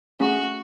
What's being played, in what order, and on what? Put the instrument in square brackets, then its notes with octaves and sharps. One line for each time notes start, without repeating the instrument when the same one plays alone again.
[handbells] A3 C#4 G#4 [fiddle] F#4